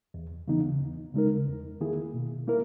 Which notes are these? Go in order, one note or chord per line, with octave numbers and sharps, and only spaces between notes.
E2
C#3 E3 B3 D#4
D#2
C#3 G#3 D#4 A#4
E2
D#3 A#3 E4 G#4
B2
A#3 E4 A#4